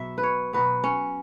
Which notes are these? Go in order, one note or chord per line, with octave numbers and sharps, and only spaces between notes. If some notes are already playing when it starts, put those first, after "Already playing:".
Already playing: B2 F#3 B3 E5
B4
C#5
B2 F#3 B3 B4
C#4